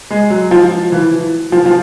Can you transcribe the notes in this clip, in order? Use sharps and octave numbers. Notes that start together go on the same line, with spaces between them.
G#3
F#3
F3
E3
F3
F3